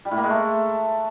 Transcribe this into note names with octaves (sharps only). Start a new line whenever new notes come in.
G3
A2
A#3
G#3
A3